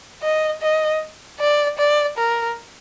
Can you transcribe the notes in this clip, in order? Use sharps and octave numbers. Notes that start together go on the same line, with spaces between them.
D#5
D#5
D5
D5
A#4